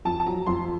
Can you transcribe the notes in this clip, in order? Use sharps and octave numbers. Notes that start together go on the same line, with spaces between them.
F2 A5
A5
F#3 A#5
F2 C6